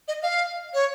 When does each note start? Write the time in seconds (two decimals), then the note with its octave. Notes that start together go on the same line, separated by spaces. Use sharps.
0.08 D#5
0.23 F5
0.74 C#5